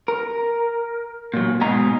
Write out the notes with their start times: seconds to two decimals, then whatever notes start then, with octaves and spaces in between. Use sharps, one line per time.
0.08 A#4
1.34 A#2 F#3
1.61 G#2 B2 G#3 G#4 A#5